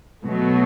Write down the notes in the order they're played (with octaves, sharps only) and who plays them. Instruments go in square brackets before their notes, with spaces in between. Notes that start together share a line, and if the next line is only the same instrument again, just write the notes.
[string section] B2 F#3 A3